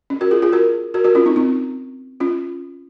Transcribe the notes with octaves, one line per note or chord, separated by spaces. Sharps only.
C#4
F#4 A#4
F4 G#4
F4 G#4
F#4 A#4
F#4 A#4
F#4 A#4
C#4 F4
C4 D#4
C4 D#4
C#4 F4